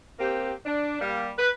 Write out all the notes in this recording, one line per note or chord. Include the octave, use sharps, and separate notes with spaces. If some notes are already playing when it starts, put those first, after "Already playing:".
A#3 C4 G4
D4
G3 A#3
B4